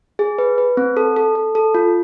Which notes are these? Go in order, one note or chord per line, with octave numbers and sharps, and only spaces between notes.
G#4
B4
B4
C4
A4
A4
A4
A4
F4